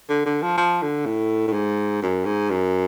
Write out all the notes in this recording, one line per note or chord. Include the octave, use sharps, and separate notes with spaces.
D3
D3
F3
F3
D3
A2
A2
G#2
F#2
G#2
F#2